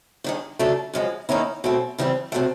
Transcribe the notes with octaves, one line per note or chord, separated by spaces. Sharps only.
G2 D#3 G#3
C#3 F#3 A3 D4
F#2 C#3 F3 G#3
D#3 F#3 A#3 C#4 E4
B2 F#3 A3 C4
C#3 E3 G3 C4
C3 D#3 F#3 A3